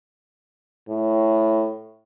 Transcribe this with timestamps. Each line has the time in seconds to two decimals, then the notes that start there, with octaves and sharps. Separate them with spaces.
0.88 A2